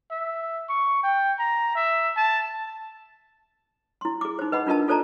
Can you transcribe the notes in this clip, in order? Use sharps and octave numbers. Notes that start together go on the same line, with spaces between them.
E5
C#6
G5
A#5
E5
A5
E4 C6
G#4 D6
D#4 C5
B4 D#5 F#5 B5
D4 F4 A#4 D#5 A5
F4 A4 C5 D5 A5 A#5